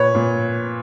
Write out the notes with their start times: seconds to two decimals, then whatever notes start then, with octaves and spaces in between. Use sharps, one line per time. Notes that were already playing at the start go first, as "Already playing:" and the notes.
Already playing: A#2 B4 C#5
0.15 A#2